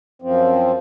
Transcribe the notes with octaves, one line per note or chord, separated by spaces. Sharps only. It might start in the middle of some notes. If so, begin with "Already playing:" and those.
F#2 F3 C4